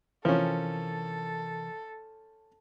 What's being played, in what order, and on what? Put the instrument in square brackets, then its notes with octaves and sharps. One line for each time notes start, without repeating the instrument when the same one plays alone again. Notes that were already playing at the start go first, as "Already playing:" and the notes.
[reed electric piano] C3 E3 A#4 [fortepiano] F3 C#4 [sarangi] A4